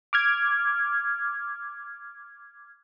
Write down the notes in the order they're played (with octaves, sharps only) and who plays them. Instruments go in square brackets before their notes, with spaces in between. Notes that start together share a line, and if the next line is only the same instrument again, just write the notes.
[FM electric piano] D6 F6 G#6